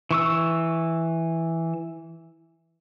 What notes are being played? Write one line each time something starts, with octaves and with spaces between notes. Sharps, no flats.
E3 C#6 E6